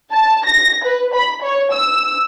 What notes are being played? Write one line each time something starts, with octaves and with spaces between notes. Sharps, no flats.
A5
A#6
B4
B5
C#5
E6